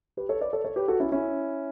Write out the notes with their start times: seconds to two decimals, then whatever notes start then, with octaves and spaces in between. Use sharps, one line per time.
0.17 G4 B4
0.29 A4 C#5
0.41 B4 D5
0.53 A4 C#5
0.64 A4 C#5
0.76 G4 B4
0.88 F#4 A4
1.00 C#4 E4
1.12 C#4 E4